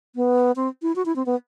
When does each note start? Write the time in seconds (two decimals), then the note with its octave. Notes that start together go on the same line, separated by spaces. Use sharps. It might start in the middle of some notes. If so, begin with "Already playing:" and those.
0.16 B3
0.56 C4
0.82 E4
0.96 F#4
1.06 E4
1.16 C4
1.26 B3